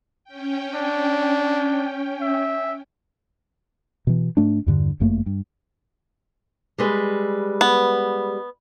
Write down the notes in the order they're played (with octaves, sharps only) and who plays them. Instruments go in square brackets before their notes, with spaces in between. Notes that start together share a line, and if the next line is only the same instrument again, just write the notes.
[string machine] C#4 G5
[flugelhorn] D4
E5
[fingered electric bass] B2 E3
G#2 A3 D4
E2 G2 D3
G1 F#2 A3 A#3
G2
[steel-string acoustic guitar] G3 G#3 B4
[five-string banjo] B3